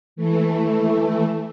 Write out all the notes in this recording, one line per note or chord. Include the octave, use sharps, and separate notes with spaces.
E3 A3